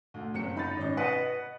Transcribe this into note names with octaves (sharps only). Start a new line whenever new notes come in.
D2
F#1 C4 C#7
D#4 B5 A6
G#1 C#4 D#5
B4 D#5 F#5